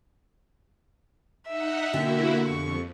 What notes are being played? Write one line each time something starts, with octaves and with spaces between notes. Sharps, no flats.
D#4 E5 F#5
B2 D3 A#3 E4 F#4 G4
F2 C#6